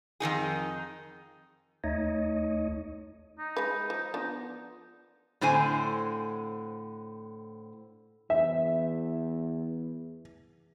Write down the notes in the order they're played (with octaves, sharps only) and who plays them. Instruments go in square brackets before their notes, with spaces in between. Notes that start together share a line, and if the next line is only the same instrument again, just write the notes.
[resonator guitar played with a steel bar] F2 D#3 D#4 G#4
[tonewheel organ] D#2 A3 D#4 C#5 D#5
[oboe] D#4
[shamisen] G#3 B4
F3
F3 B3 D4
[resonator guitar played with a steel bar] A2 D3 C4 C5 G#5
[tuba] E2 [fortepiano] E5